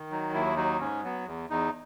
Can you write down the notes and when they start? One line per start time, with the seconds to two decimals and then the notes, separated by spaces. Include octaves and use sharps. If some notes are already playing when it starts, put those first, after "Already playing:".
Already playing: D#3
0.11 F#3 D#4
0.34 D#2 E4
0.57 F#3 D#4
0.80 G#2 C#4
1.03 F#3 B3
1.26 E2
1.50 E2 D#4